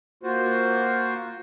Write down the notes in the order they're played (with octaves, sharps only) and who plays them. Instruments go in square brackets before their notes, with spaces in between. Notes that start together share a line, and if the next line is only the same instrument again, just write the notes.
[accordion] A#3 F4 F#4 C5